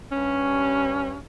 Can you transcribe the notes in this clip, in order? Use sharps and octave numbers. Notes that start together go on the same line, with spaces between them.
G2 C#4